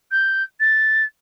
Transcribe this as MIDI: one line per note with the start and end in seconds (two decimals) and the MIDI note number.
0.11 0.43 91
0.60 1.05 93